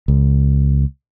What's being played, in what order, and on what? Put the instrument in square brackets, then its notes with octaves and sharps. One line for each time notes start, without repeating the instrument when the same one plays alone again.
[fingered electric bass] C#2